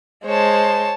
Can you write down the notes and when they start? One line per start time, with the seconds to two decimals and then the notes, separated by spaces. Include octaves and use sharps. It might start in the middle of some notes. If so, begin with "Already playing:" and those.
0.26 G#3 C5 C#5 A5